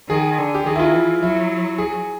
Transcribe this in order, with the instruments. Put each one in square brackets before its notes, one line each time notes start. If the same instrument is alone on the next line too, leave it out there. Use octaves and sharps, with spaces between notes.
[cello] D#3 [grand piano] G#4
[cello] D3
[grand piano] G4
[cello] D#3 [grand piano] G#4
[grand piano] E4
F4
[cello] E3
[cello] F#3 [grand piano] E4
[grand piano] G#4